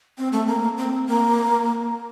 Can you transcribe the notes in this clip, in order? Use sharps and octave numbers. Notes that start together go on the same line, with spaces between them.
C4
A3
A#3
C4
A#3